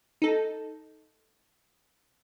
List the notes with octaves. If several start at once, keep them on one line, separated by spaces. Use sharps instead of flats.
D#4 A4